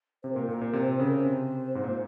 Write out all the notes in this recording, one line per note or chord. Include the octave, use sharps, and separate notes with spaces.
C3 C5
A#2 A#4
A#2 A#4
A#2
C3 C5
C5
C#3 A#4
C5
C3
G#2
A#2